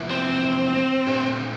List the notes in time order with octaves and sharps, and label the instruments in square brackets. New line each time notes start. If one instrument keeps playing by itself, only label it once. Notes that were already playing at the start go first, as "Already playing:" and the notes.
Already playing: [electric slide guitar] E2 C3 F3 A#3 E4
[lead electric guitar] C4
[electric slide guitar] A#2 A3 D4 G4